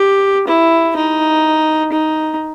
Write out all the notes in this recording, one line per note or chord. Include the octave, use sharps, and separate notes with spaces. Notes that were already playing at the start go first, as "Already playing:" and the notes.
Already playing: G4
E4
D#4
D#4